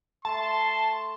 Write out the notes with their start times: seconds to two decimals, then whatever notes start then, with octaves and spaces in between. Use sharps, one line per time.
0.25 A3 A5 C6